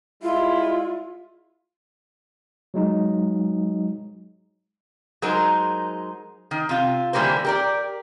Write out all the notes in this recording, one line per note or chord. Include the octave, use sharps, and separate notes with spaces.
G3 G#3 E4 F4
F#3 G#3 D#4
F#3 G#3 D#4 A#4 C5
D#3
C3 F4
D3 E3 G3 A#3 A#4 C5
G4 A#4 D5